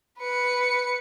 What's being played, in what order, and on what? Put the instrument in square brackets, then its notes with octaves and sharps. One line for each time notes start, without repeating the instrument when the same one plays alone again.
[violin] B4 C#7